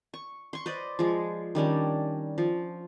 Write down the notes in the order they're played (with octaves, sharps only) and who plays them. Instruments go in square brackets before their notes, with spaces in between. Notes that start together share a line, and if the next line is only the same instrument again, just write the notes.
[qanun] C#6
C6 C#6
B4 C5 D5 D#5
F3 G#3
D#3 G3 C#4 D4
F3